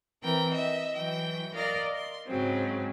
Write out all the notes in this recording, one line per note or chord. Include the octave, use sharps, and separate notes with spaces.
E3 C4 A#4 G5
D#5 E5
E3 F#3 G5
A#4 D5 D#5 F5 A#5
C6
G#2 C#3 F#3 C4